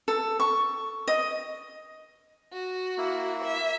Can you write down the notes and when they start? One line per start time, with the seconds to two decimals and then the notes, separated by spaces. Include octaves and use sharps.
0.08 A4
0.40 C#6
1.08 D#5
2.52 F#4
2.98 A#3 E4
3.44 E5